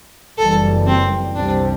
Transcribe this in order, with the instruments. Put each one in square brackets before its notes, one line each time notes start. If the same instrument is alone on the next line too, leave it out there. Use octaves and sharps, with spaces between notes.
[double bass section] F#1 F#2 E3 G3 [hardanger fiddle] A4
[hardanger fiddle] C4
[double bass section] C2 C3 G3 C4 [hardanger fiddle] D4